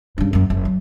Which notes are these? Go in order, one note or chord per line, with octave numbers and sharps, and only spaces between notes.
G2 C#3
F#2 A#3
F#1
F#3